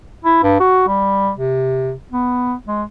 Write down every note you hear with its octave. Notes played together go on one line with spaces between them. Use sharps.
E4
G2
F#4
G3
C3
B3
G#3